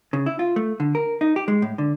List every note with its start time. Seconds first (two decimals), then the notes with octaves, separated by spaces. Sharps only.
0.13 C#3
0.26 E4
0.39 F4
0.56 A3
0.80 D3
0.95 A#4
1.21 D#4
1.36 G4
1.48 G#3
1.62 A2
1.78 D3